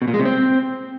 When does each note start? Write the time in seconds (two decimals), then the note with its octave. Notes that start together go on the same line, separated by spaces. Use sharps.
0.02 B2
0.08 A#2
0.14 G#3
0.19 C3
0.25 C4